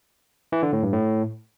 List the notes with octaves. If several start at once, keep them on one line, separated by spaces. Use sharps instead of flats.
E3
D3
A2
G2
A2